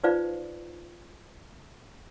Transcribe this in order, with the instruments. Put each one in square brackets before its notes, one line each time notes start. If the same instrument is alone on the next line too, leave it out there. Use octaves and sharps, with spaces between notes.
[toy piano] D#4 F4 B4 C5 D5 F5